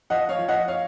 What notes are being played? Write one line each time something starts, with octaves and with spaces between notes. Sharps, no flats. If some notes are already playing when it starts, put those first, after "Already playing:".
F3 D#5 F#5
C#5 F5
F3
D#5 F#5
C#5 F5